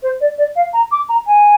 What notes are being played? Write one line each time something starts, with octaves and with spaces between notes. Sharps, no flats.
C5
D5
D5
F5
A#5
D6
A#5
G#5